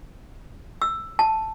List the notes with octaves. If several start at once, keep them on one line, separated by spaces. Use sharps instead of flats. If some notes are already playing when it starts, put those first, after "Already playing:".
E6
A5